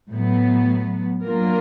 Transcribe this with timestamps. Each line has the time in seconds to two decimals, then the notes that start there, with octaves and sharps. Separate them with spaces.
0.12 A2 F#3 B3
1.24 F#3 A#3 D4 F4 A#4